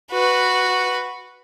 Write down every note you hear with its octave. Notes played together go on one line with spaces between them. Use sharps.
F#4 B4